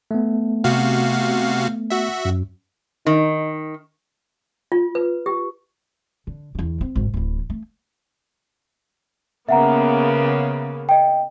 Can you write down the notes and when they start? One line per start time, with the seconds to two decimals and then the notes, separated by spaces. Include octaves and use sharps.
0.11 A3 B3
0.64 C3 F#4 F5
1.90 F#4 E5
2.25 F#2
3.07 D#3 D#4
4.72 F4
4.95 B4
5.26 G4
6.27 D3
6.55 E2 D3
6.81 C4
6.96 G#1 F#2
7.14 D1 E3
7.50 A3
9.49 C#3 A#3 B3 E5 F#5 A#5
10.89 D#5 G5